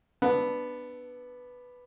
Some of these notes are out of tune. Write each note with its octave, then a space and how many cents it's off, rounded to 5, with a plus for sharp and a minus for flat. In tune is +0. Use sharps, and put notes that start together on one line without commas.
B3 +0 D4 +15 A4 +0